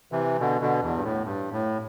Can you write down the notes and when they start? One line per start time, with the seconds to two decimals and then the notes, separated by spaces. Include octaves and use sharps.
0.12 C3 E3
0.40 B2 D3
0.62 B2 D3
0.82 E2
0.97 G2
1.04 A2
1.24 G2
1.53 A2